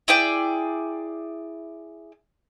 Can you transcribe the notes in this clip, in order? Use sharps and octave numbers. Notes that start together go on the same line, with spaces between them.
E4 G#4 D5 G5